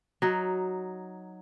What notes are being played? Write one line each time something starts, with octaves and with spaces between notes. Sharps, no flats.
F#3 D#4